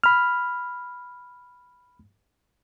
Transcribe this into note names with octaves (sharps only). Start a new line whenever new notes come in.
B5 F6